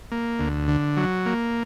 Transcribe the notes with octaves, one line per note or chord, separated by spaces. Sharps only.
A#3
D2
D3
F#3
A#3